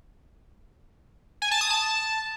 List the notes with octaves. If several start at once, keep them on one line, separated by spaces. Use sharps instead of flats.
G#5
A5
D#6
A5